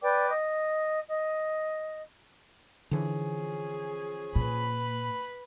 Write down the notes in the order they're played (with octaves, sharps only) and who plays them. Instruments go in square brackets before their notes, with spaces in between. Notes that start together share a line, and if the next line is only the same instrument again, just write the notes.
[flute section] B4 D5 G5 D6
D#5
D#5
[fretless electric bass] D3 E3 [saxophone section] F3 C#4 G#4
[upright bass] A#2 [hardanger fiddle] B4 B5